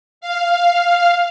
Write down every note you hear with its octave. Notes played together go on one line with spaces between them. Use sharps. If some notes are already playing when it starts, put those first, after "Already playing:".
F5